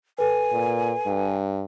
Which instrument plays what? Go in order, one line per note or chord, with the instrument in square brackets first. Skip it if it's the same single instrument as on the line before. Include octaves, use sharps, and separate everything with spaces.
[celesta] A4 B4 [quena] G#5
[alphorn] A#2
G2